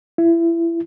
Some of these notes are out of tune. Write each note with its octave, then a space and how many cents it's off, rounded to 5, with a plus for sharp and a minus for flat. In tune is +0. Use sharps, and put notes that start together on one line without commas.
E4 +25